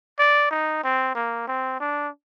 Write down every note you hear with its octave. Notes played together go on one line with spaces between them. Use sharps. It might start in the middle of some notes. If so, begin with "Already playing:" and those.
D5
D#4
C4
A#3
C4
D4